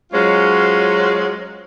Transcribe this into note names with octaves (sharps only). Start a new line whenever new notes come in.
F#3 G#3 C#4 F4 C5 C#5